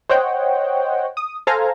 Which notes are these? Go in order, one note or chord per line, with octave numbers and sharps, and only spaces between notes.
C5 C#5 D#5 F#5 G5
D#6
A4 C5 F5 G#5 A#5